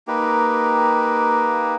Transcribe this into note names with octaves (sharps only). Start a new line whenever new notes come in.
A#3 D#4 G4 B4